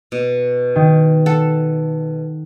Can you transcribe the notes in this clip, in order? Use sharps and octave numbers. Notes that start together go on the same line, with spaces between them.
B2
D#3
A4 F#5